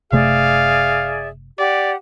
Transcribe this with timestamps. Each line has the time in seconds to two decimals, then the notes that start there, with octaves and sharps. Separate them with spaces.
0.12 F#1 C3 A3 G#4 D5 E5 F5
1.59 G4 D5 F#5